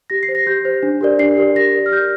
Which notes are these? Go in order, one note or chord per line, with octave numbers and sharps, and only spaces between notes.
G4 A#6
C7
C5
A#6
G4 G6
C5
D4
G4 A#4 D5
D4 C7
G4 A#4 D5
G4 A#6
A#4 D5
F6
G4 G6